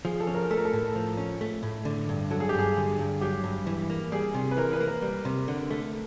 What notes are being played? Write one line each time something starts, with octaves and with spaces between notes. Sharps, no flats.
F3 G#4
A4
C#4
A#4
A3 A4
A#4
A4
A2
F3
C#4
A3
A2
D3
G2
F#3 A4
G#4
G4
G2 G#4
D3
G2
F#3 G4
G2
E3
A#3
G3 G#4
C3
B4
E3 A#4
B4
A#3
A#4
G3
C3
D3
A3